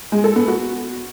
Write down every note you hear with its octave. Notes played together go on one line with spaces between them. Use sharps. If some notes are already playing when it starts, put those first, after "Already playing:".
G#3
A4
B3
F#4